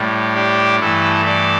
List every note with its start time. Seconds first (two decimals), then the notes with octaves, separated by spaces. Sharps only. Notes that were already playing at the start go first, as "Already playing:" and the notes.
Already playing: A2 G3
0.35 D4 G4
0.80 G2 E3 A3 E4 A4
1.25 A4 D5